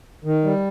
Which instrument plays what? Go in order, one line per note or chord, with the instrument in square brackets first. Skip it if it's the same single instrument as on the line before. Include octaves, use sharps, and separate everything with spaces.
[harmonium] D#3
G3